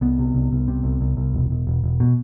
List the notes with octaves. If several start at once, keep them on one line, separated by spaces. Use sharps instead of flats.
C2 B3
C3
C2
C2
C3
C2
C2
C2
E1
E1
E1
E1
B2